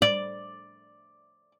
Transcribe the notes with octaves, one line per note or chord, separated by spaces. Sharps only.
D5